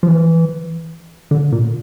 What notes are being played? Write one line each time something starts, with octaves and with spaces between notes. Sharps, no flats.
F3
E3
D3
A#2